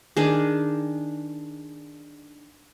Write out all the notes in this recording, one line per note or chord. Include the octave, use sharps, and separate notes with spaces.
D#3 D4 G#4